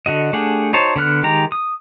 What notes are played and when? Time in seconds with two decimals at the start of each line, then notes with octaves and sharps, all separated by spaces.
0.06 D3 F#4 D#5
0.33 A3 D4 G4 G#4 F#5
0.73 D#4 F#4 C5 C#5 A5
0.96 D3 B3 F6 F#6
1.23 D#3 G#3 G4 A#5
1.52 D#6